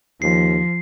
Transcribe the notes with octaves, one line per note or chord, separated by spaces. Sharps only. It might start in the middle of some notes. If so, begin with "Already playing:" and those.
D#2 F3 C7